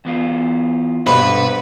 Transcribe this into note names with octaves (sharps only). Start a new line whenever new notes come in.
E2 B3 F4
G2 B2 D4 A4 B4 C5